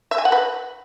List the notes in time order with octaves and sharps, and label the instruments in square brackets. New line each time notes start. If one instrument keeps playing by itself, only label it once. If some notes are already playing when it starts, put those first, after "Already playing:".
[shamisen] E5
G#5
F#5
B4